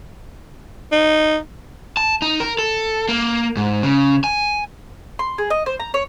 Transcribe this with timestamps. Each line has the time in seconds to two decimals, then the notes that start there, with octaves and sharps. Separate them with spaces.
0.92 D#4
1.97 A5
2.22 D#4
2.40 A#4
2.59 A4
3.09 A#3
3.57 G#2
3.83 C#3
4.24 G#5
5.19 C6
5.38 G#4
5.50 D#5
5.66 C5
5.80 A#5
5.94 C#5